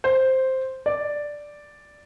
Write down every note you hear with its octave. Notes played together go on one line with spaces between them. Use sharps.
C5
D5